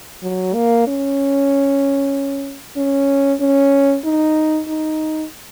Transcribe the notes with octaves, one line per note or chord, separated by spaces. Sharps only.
F#3
A#3
C#4
C#4
C#4
D#4
D#4